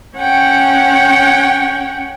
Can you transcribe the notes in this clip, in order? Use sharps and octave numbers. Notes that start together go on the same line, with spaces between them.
C#4 C#5 F#5 G5